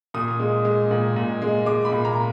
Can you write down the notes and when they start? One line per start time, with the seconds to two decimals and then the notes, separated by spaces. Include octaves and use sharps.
0.14 A#2 D#6
0.40 G#3
0.65 G#3
0.91 A#2
1.16 A#2
1.42 G#3
1.66 G#3 D6
1.85 B5
1.92 A#2
2.05 A#5